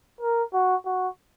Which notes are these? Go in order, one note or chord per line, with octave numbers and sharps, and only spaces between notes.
A#4
F#4
F#4